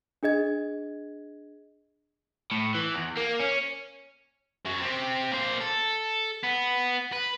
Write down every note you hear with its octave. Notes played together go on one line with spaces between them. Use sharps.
D4 G#4 D#5 G#6
A2
E3
E2
A#3
C#4
F#2 F#3
C4 G4
A#3 C5
A4
B3
B4